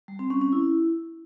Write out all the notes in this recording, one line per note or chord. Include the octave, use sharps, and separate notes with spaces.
G3
C4
C#4
C#4
E4